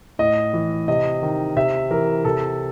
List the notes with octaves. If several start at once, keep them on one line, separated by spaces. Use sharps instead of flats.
A2 D#5
E3
C3 D#5
D#3
C3 E5
E3 A#4
C3 A4